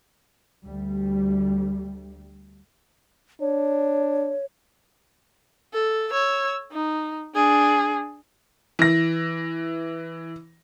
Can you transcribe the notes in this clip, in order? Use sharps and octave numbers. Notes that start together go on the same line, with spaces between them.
D2 G3
D4 C#5
A4
C#5 E6
D#4
D4 G#4
E3 A#6